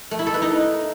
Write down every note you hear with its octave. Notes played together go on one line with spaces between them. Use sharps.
A3
E4
A4
B4
D#4